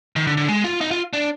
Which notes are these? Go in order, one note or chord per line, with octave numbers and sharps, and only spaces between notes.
D#3
D3
D3
G#3
F4
D#4
F4
D4